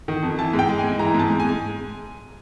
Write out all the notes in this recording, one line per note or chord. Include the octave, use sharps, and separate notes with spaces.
D#3
F2
E3 A5
G#2
G5
G#3
G#2 G#5
E3 A#5
G#2 A5
G#2
G#5
G#2